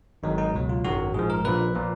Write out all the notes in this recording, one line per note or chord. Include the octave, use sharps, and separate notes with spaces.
G#1 G#2 D#3 F#3 D#4
D#4
C#2 B2 F#3
F4
G#1 F#2 D#3 F#3 F#4
A#1 G#2 F3 G#4
A#4
A#1 A#2 F3 B4
A#2 F3